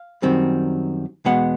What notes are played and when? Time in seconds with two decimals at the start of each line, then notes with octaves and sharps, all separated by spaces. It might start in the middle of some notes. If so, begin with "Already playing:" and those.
Already playing: F5
0.22 F#2 D#3 G3 C4
1.25 E2 B2 G#3 B3 F#5